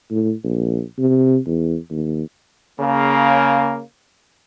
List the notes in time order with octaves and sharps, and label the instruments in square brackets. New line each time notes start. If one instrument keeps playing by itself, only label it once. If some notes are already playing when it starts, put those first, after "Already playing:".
[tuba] A2
A#1
C3
E2
D#2
[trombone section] C#3 A#3